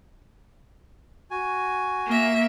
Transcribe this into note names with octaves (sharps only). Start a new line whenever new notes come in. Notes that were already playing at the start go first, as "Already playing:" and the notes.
F#4 G#5
A#3 E5